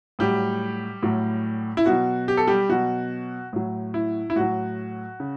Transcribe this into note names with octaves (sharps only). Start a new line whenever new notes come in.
A2 F#3 G3 G4
A2 F#3
E4
B2 F#3 F#4
G4
A4
G3 G4
B2 F#3 F#4
A2 F#3
E4
E4
A2 F#3 F#4
C#3